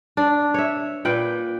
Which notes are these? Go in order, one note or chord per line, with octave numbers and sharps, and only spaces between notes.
D4
C#5 E5
A#2 B4 G5